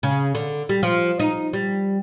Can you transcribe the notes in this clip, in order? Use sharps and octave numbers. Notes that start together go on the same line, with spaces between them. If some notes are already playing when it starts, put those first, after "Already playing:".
C#3
D3
G3
F3
D#4
G3